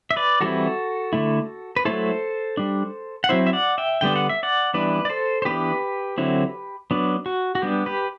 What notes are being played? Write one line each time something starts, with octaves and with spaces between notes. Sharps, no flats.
E5
B4 D5
E3 G3 C4 E4 F#4 A4
D3 A3 E4
B4
F#3 A3 E4 A4 C5
G3 D4
F#5
F#3 C4 E4 C5 E5
E5
D5 F#5
E5 G5
D3 G3 B3 D4 G5
F#5
E5
D5 F#5
E3 G3 B3 D4 B4 D5
D5
A4 C5
C5
E3 B3 D4 G4 B4
D3 F#3 C4 E4
F#3 B3 D4
F#4
F#4
G3 B3 D4 G4
G4 B4